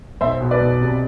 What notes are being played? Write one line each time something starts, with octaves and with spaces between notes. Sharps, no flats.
B1 C5 E5
B2
B4 D5
B1
C3